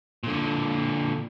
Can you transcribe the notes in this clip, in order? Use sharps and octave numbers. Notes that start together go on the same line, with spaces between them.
A#2 D3